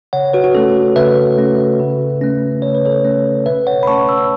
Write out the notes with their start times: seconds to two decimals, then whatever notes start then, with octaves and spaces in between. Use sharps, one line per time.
0.13 C#3 C#5 F#5
0.33 F#4 B4
0.44 F#4
0.54 A3 C#4 A4
0.96 C#3 B4 E5
1.38 A3 C#4
1.80 C#3
2.21 A3 C#4
2.62 C#3 C#5
2.75 B4
2.86 A4 C#5
3.04 A3 C#4
3.46 B2 B4 E5
3.67 C#5 F#5
3.83 B5
3.87 A3 C#4 A5 C#6
4.08 B5 E6